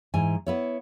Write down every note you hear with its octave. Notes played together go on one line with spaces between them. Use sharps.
G#2 E3 G#5
B3 E4 C#5